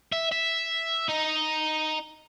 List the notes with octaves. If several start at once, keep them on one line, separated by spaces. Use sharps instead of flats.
E5
E5
D#4